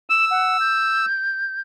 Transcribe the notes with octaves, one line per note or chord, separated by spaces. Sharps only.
E6 E7
F#5
G6